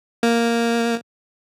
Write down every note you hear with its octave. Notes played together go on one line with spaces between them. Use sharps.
A#3